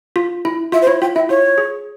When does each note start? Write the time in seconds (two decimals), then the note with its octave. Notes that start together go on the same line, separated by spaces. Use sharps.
0.16 F4
0.45 E4
0.72 F4 E5
0.82 C5
0.87 E4 C#5
1.01 F4 G5
1.15 E4 E5
1.29 F4 C#5
1.58 G#4